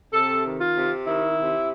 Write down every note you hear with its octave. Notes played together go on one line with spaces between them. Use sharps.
C3 A4
D#3
F4
C3
D#3 E4
C3